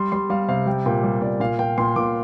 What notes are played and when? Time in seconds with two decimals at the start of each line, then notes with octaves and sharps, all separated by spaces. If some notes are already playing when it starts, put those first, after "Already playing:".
Already playing: G3 C6
0.12 G3 C6
0.30 G3 F5
0.48 C3 F5
0.66 G3 G5
0.86 A#2 G5
1.03 G3
1.22 A#2 D5
1.40 A#2 F5
1.59 A#2 G5
1.78 A#2 C6
1.96 A#2 D6